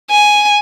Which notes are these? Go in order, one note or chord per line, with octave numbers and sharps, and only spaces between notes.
G#5